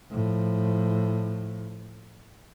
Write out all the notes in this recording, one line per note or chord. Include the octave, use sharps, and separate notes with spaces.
A2 F3